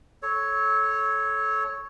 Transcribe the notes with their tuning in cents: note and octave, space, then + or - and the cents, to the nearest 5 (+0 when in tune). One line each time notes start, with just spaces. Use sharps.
A4 -20 C#5 +0